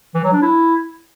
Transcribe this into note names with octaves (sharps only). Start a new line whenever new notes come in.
E3
F#3
D4
E4